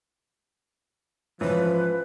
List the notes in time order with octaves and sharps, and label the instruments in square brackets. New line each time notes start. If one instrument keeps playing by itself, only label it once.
[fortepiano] G#2 E3 C#4 [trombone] F3 [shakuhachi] B4